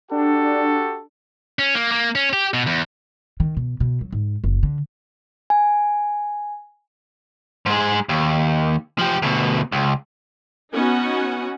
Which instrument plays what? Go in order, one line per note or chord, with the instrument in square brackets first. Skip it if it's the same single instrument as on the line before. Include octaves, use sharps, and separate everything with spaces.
[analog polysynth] D4 [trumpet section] F#4 G4 A4
[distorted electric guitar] C#4
A#3
A#3
C#4
G4
B2
E2
[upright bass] D#3
B2
B2
F#3
G#2
F#1
D3
[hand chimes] G#5
[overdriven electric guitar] G#2 G#3
D#2
F3 G4
D2 B2
C#2
[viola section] B3 C#4 D#4 F#4 F#5 G#5